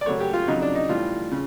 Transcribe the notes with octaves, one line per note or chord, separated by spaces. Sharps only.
D5
F#2 C#3 F#3 A3 C#5
G4
F4
F2 C#3 F#3 D#4
D4
D#4
A2 E3 G3 F4
C#3